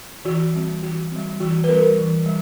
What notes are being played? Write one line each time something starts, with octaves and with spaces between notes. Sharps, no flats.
E3 F#4
G3 C4
E3 F#4
G3 C4
E3 F#4
B4
G3 C4 A#4
E3
G3